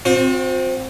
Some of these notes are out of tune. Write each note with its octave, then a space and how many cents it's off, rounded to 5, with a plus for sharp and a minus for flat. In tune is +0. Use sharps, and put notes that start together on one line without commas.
C4 +0 F#4 -45